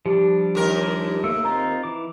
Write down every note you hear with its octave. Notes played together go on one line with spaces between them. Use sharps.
F3 G3 D4 G4
D#2 A#4
A3 A#3 E6
C4 D#4 F4 A#5
E3 D6